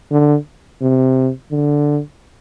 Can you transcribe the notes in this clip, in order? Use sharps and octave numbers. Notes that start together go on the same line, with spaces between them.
D3
C3
D3